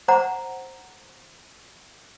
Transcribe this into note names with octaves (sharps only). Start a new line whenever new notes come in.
C5 D5 F#5 A#5